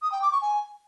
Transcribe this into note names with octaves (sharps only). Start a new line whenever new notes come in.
D#6
G5
D6
C#6
G#5